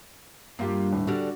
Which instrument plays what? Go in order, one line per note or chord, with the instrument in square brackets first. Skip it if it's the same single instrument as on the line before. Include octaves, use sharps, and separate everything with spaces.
[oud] G2 [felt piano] A#3 F4 G4
[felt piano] D#1 A2
[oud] D3 G3 [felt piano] D4 F#4